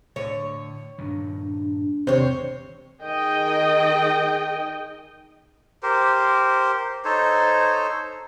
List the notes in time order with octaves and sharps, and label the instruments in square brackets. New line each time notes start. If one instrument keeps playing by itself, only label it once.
[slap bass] A2 D3 [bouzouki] C#5
[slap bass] G2 A#2 D#3 [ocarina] D4
[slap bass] G#1 E2 [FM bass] C3 [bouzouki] C5 C#5
[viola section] D#3 G#4 D#5 G5
[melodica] G4 A#4 C5
D#4 A4 C5 C#5